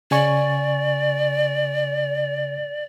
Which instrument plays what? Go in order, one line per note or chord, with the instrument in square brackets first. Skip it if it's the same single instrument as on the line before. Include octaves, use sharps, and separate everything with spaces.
[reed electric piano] C#3 G#5 C#6 [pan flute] D5